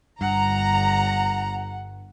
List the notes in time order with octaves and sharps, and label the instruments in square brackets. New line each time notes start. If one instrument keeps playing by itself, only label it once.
[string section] G1 A#5 [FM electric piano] G2 [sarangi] F#5